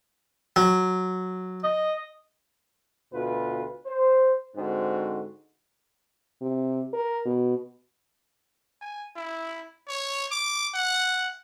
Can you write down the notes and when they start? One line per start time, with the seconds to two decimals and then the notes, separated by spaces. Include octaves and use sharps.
0.56 F#3
1.63 D#5
3.13 D2 B2 F4 B4
3.86 C5
4.56 G#2 D3 C4 F#4
6.42 C3
6.93 A#4
7.25 B2
8.81 G#5
9.16 E4
9.88 C#5
10.31 D6
10.74 F#5